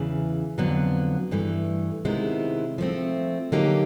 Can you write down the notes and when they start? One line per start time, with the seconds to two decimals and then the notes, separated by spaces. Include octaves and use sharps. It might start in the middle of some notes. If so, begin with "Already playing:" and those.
Already playing: E2 C#3 E3
0.58 F2 D3 F#3 B3
1.31 G2 E3 A3
2.05 C3 D#3 G#3 B3 E4
2.78 F3 A3 C4
3.52 D3 F#3 A#3 D#4 G4